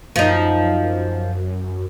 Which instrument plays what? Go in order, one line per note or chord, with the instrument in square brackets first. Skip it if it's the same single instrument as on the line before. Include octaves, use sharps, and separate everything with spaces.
[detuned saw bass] F#2 [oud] F3 D#4